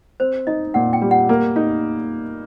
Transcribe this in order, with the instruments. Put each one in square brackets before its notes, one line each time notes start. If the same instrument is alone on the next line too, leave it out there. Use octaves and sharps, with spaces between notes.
[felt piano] C4 [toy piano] C5
[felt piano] D#4 [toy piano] D#5
[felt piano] A#2 [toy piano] F#5
[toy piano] G5
[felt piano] G3
[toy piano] F#5
[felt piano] A#3
D#4